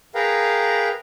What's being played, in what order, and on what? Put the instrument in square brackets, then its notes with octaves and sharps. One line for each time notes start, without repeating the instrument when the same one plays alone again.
[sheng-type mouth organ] G#4 A#4 B4 F5 G5 A#5